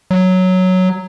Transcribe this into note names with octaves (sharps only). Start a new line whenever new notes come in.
F#3